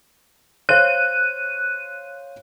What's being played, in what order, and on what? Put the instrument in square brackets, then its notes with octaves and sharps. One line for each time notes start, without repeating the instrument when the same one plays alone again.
[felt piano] C5 C#5 F5 [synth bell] F#6 D#7